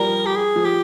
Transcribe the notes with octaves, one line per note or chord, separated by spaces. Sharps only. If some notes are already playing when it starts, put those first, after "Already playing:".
Already playing: F3 G3 A#4
G4
G#4
F3
G4